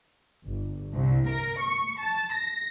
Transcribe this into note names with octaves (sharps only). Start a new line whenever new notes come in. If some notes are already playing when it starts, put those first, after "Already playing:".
G1
C2
A#4
C#6
A5
A#6